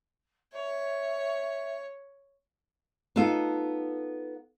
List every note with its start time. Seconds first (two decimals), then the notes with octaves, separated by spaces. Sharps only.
0.53 C#5 E5
3.16 B3 D#4 F4 A4